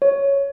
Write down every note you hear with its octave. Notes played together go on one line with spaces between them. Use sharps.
C#5